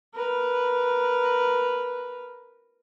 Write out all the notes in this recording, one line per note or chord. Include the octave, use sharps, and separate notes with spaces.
A#4 B4